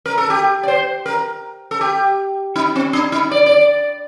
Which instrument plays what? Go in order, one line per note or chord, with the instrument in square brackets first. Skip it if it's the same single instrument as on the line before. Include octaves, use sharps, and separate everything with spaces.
[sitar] A#4
A4
G4
D5
C5
A#4
A4
G4
D#4
C4
D4
D#4
D5
D5